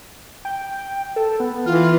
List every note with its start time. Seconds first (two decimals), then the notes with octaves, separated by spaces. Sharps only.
0.45 G5
1.16 A4
1.40 B3
1.66 E3 F4 F6